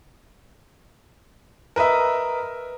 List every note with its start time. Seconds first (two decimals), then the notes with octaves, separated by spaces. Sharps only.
1.76 A#4 B4 D#5 E5